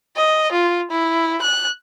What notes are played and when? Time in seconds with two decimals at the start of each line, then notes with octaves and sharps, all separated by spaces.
0.17 D#5
0.52 F4
0.91 E4
1.42 F#6